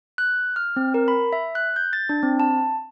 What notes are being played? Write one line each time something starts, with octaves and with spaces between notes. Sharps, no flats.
F#6
F6
C4
A#4
B5
E5
F#6
G6
A6
D4
C4
A5